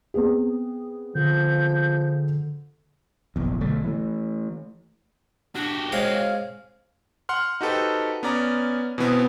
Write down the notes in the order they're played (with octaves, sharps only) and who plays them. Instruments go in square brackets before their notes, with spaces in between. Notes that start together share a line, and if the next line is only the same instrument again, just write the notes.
[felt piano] B3 C4 G#4
[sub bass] D3 [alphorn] F3 [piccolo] G6
[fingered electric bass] F1 A#1 E2
B1 D3 F#3 A3
E3 A3
[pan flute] D4 [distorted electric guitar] F#4 G4
[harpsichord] G#3 C4 D#6 [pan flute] C#5 [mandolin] F5
[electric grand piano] F#5 C6 F6
D#4 F#4 G4 A4 B4 C5
B3 C#4 D5 A#5
B2 E3 B3 C4